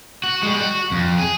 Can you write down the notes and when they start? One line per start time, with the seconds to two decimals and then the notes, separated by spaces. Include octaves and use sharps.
0.24 F#4
0.43 G3 G#3
0.60 F#4
0.91 F2
1.19 G#4